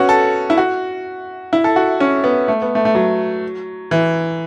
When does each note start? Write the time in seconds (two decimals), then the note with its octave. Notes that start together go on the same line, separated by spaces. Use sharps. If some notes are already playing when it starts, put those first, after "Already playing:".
Already playing: B3 C#4 F#4
0.09 A4
0.50 E4
0.58 F#4
1.53 E4
1.64 A4
1.76 F#4
2.00 C#4
2.24 B3
2.48 A3
2.62 B3
2.75 A3
2.85 A3
2.95 F#3
3.91 E3